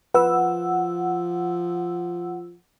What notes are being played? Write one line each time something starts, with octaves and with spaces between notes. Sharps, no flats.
F3 B4 F#5 E6